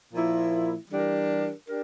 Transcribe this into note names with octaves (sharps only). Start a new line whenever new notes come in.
A#2 F3 A#3 E4
E3 G3 D4 G4 A#4
D4 G4 A#4